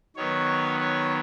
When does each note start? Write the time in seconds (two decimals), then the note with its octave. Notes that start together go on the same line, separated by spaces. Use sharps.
0.16 D#3 F#3 B3 C#5
0.80 C#5